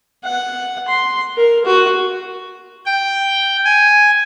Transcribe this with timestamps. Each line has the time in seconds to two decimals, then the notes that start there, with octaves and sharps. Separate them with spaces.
0.24 F#5
0.88 C6
1.36 A#4
1.66 F#4
2.86 G5
3.65 G#5